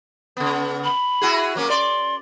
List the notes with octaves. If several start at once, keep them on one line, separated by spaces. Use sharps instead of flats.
C#3 B3
B5
E4 F#4 G#4
F#3 A#3 C#4
D5 C6